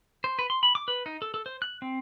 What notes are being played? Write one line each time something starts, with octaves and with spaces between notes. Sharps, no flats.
C5
B4
C6
B5
D6
B4
D#4
A4
A4
C5
F#6
C4